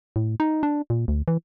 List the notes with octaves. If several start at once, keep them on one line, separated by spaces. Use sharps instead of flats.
A2
D#4
D4
A#2
D2
E3